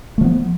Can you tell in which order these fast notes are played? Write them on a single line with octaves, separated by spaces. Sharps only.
A3 F3 B3